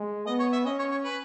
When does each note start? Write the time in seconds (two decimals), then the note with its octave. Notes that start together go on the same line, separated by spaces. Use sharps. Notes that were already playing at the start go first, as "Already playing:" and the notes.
Already playing: G#3
0.27 B3 D#5
0.40 C#5
0.53 E5
0.65 C#4 D#5
0.79 C#5
0.92 C#5
1.05 B4